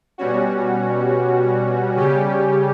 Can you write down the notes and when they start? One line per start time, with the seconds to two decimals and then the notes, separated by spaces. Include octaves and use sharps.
0.18 B2 G3 C#4 F#4
1.96 C#3 G3 C#4 G4